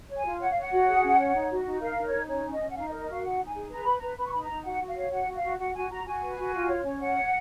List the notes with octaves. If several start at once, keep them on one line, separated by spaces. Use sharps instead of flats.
C#5
G#5
F4
C#5 F#5
F5
C#5 F#5
F#4
G#4
C#4
C#5
D#4
F#4
D#4
A#4 F5
D#4
C#5
D#4
C#4 C#5
C#4
D#5
C#4
F#5
D#4 F5
D#5
A#4
D#5
F#4 F5
D#4 F#5
D#4
G#5
G#4
B4 A#5
B4 B5
B4 A#5
B4 B5
C#6
D#4 B5
A#5
D#4
F#4 F#5
F#4
F5
C#5
F#4 F#5
F#4
F5
F#4
F#4 F#5
F#4 G#5
F#4 A#5
F#4 G#5
B4
F#4
F4
C#5
C#4
C#5 F#5
C#5